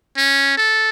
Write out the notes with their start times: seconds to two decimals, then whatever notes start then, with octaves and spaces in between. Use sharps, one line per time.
0.18 C#4
0.57 A4